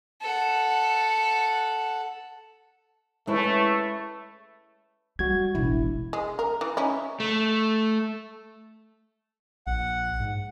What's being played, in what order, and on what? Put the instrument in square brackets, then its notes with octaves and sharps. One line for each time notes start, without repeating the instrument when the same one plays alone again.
[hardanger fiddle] A4 F#5
[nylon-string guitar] G#3 E4 [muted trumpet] A3 [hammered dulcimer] B4 C#5 E5
[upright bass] G3 [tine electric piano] F#4 G#6
[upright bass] E1 [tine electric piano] A1 E4
[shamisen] G#3
A#4
E3
C#4 D#4 E4
[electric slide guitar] A3
[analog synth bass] A#1 [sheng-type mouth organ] F#5
[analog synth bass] G#2